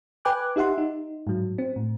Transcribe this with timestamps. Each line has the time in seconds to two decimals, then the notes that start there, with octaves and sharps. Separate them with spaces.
0.25 B4 G5 G#5 D6 F#6
0.56 D#4 G4 E5 F#5 C6
0.78 D#4
1.27 G#2 F#3
1.58 C4
1.76 A2